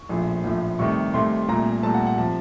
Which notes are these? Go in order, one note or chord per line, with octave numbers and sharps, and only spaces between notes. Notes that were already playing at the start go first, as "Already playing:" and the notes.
Already playing: C#6
A#1 A2 F3 A3
A#1 A2 F3 A3
C2 C3 D#3 A3 C#6
C2 C3 D#3 A3 C6
C2 A#2 A3 A#5
C2 A#2 A3 A5
F#5
F#5
C3 F3 A5